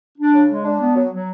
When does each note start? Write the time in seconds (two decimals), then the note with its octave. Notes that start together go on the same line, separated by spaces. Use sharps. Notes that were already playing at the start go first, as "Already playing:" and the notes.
0.18 D4
0.34 C#3
0.49 G#3
0.65 D4
0.80 B3
0.96 F#3
1.12 F#3